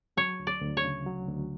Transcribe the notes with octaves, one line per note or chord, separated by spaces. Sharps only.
F#3 C#5
D2
D5
D2
C#5
C#3
F#3
D2